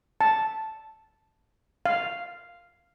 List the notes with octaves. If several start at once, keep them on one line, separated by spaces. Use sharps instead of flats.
A5
F5